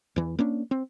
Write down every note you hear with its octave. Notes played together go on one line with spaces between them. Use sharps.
E2 E3
A#3 C#4 D4
C4